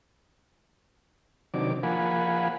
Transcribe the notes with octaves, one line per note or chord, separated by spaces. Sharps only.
C3 D#3 F#3 D4 D6
F3 A#3 F5 F#5 G#5 B5